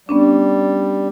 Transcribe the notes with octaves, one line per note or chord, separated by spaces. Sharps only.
G3 B3 C#4 D4